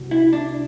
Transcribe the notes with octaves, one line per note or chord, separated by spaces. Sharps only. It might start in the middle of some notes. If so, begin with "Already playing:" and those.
Already playing: C2 B2 G3
E4
D4